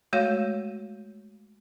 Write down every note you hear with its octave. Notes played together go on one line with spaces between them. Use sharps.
G#3 A3 F#4 C#5 F5